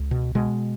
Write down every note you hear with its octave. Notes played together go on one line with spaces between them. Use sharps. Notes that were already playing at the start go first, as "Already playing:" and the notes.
Already playing: C#2
B2
B2 G#3